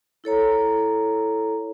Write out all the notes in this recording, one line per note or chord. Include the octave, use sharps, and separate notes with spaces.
E4 A4 C#5 A#5